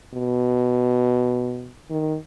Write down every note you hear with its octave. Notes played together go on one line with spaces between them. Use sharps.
B2
D#3